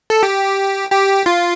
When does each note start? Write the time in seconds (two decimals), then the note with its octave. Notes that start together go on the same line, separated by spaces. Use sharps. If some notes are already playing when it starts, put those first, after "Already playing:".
0.10 A4
0.23 G4
0.92 G4
1.26 F4